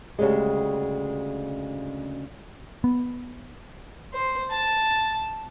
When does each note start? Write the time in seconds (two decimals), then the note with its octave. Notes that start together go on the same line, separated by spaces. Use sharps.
0.19 D2 C#3 G3 G#3
2.84 B3
4.13 C5
4.50 A5